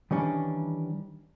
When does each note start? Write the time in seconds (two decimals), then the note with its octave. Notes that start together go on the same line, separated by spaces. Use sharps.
0.11 D#3 E3 G3 C#4 D4